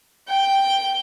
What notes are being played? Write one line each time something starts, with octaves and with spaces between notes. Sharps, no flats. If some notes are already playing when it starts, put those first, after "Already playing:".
G5